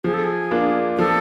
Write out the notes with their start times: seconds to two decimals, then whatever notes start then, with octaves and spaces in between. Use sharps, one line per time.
0.04 F3 G#4
0.14 A4
0.24 G#4
0.51 A#3 D4 F4
0.98 F3 A4